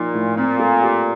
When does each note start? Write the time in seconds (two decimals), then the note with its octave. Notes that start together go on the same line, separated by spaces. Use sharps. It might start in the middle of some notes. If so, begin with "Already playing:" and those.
Already playing: A#2 F3 A#3 D#4
0.14 A2
0.37 A#2 C4
0.59 A3
0.82 G4